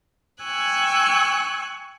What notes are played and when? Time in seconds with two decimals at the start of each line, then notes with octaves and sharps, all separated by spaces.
0.43 G5 G#5 C#6 E6 F#6 G#6